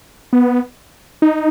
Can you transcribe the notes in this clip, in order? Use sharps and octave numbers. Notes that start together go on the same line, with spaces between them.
B3
D#4